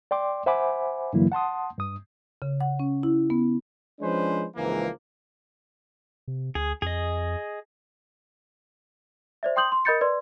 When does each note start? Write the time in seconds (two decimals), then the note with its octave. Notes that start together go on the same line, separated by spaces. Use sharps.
0.11 D5 G5 C6 D6
0.46 C5 E5 F#5 G#5 B5 D6
1.13 G2 D3 E3 F#3 A#3 E4
1.32 F#5 A5 C6 D#6
1.79 G2 D#6
2.42 C#3
2.61 F#5
2.80 C#4
3.03 E4
3.30 B3
4.00 F3 G#3 C#4 D4 B4 C5
4.56 C#2 G#2 E3 F3 A#3
6.28 C3
6.55 D2 G#4
6.82 F2 G#4 D#5
9.43 C5 D5 E5
9.56 G5 C6 D#6 G6 F#7
9.72 C6
9.85 A#4 D#5 B5 G6 A6 C#7
10.01 B4 D5 C6